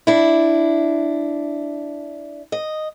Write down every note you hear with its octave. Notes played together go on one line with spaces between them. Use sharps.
D4 E4
D#5